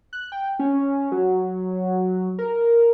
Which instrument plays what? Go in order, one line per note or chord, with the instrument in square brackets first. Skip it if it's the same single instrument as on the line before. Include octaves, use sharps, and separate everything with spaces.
[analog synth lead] F#6
G5
C#4
F#3
A#4